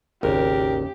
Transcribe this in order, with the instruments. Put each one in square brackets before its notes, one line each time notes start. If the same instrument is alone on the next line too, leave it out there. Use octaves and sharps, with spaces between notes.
[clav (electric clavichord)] G#1 [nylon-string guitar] D#2 C#3 [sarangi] G4 [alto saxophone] A#4